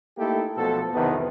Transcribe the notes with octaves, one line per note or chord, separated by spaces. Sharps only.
A3 A#3 D#4 E4 G4 A4
B1 B2 F3 A4
B1 E2 C3 D#3 E3 B3